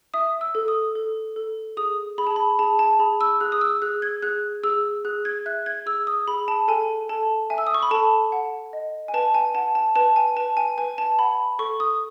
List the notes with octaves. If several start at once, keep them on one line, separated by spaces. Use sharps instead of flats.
E5 D#6
E6
A4
D#6
A4
A4
G#4 D#6
G#4 B5
A5
B5
G#4 A5
A5
G#4 B5
E6
G#4 F#6
D#6
E6
G#4 F#6
G#6
G#4 F#6
G#4 E6
G#4 F#6
G#6
E5 F#6
G#6
G#4 E6
D#6
G#4 B5
A5
A4 G#5
A4 A5
E5 G#5
E6
D#6
C#6
B5
A4 A5
F#5
D#5
G#5
B4 A5
G#5
F#5 A5
A5
B4 A5
G#5
B4 A5
G#5
B4 G#5
A5
F#5 B5
A4 C#6
D#6